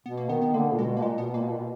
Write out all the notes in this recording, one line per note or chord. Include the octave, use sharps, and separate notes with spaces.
B2 B3
A#3
D#3 B3
B3
D3 A#3
A#2
B2 G#3
B2 A#3
A#2 G#3
B2 B3
A#2 A#3
B2
A#2
B2